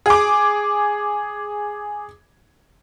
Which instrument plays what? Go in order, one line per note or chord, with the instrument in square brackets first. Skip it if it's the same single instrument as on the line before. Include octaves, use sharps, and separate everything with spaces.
[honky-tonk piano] G#4 D6